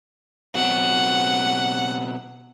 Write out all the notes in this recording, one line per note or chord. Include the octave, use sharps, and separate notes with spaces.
B2 F#3 C4 F#5